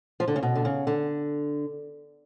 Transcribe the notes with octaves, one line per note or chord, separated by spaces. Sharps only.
F3
D3
C#3
B2
D3
C#3
D3